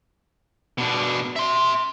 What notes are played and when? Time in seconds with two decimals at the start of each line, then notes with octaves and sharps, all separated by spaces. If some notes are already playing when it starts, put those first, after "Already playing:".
0.78 B2 D4
1.36 E5 C6